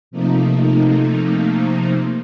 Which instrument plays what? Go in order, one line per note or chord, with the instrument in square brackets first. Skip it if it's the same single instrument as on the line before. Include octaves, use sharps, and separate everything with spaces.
[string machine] C3 F3 A3 A#3 D#4